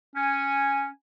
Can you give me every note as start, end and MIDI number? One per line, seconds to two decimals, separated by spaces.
0.16 0.88 61
0.16 0.86 80